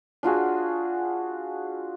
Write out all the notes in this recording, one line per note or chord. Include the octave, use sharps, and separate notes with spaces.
D4 F4 F#4 G#4